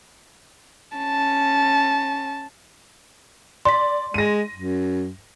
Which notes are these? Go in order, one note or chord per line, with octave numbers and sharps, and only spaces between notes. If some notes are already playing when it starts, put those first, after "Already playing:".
C#4 A5
D5 C6 B6
G#3 A#6 D#7
F#2